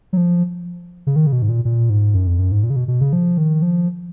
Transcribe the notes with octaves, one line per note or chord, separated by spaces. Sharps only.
F#3
F3
C#3
D#3
C#3
B2
G#2
A#2
A#2
G#2
F#2
F2
F#2
G#2
A#2
C#3
B2
B2
C#3
F3
D#3
F3